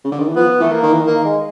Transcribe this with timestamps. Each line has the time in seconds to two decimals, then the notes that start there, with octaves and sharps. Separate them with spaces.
0.04 C#3
0.12 D3
0.19 D#3
0.28 E3
0.35 F3 B3
0.60 E3 A3
0.72 A#3
0.83 D#3
0.92 E3
1.01 D#3
1.07 A#3
1.24 G#3